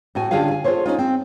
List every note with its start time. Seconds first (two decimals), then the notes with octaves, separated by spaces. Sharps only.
0.15 A2 F#4 G#5
0.31 D3 C#4 F4 G4 G#4 F5
0.51 G#5
0.64 F4 G#4 A4 C5 C#5
0.85 C#4 D#4 F4
0.99 C4